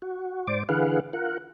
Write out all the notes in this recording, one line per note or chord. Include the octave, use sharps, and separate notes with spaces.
F#4
G#2 C5 D5 D6
D3 E3 G#4 B4 F5 F#5
F4 A#4 F#5